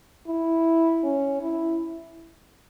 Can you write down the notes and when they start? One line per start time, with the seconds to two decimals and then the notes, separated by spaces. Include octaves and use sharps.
0.28 E4
1.04 C#4
1.42 E4